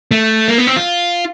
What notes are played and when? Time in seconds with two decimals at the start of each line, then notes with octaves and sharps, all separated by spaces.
0.11 A3
0.48 A#3
0.58 B3
0.67 C4
0.76 F4